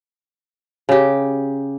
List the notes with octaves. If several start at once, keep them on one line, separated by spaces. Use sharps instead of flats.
C#3 G4